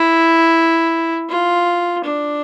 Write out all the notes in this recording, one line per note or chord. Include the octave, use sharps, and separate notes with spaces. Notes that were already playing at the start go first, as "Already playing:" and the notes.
Already playing: E4
F4
D4